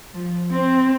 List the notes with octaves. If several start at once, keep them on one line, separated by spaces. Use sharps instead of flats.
F3
C4